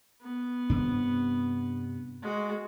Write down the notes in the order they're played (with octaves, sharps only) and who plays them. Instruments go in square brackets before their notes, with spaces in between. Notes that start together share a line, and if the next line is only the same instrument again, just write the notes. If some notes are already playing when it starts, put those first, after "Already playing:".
[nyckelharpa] B3
[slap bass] G2 C3 D4
[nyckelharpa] G#3 F#4